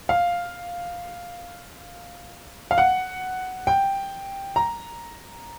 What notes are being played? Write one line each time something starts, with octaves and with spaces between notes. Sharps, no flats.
F5
F5
F#5
G5
A#5